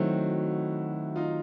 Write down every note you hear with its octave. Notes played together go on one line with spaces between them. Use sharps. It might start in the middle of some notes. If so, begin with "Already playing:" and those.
Already playing: D#3 F#3 A3 C4 E4 F#4
D#4 F4